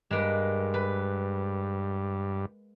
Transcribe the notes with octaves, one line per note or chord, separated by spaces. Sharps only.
G2 G#3 A#3 B4
B4